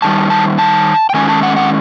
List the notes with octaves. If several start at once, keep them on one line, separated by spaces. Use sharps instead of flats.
F#2 D#3 G3 A5
A5
A5
G5
D#3 G#3 C#4 G#5
A5
F#5
F#5